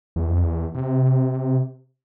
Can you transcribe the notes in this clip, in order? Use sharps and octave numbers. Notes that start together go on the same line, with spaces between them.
E2
F2
E2
C3